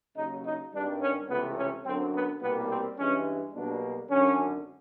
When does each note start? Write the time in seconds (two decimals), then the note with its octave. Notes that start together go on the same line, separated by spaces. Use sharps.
0.16 D#2 C#3 F#3 D#4
0.45 D#4
0.73 G#1 G2 D#3 G3 D4
1.01 C#4
1.29 C#2 C3 E3 A3 B3
1.58 C#4
1.85 F#2 D3 F#3 C4
2.14 B3
2.41 C2 B2 G3 A#3 B3
2.69 C4
2.98 G2 E3 G#3 C#4
3.54 B1 B2 G3 A#3 D4
4.10 G#1 F#2 D3 C#4